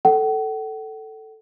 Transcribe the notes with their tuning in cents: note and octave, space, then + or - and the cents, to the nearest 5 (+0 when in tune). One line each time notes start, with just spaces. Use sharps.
A4 +0 F#5 +45